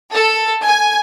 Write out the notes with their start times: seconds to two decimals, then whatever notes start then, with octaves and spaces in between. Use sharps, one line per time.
0.12 A4
0.65 G#5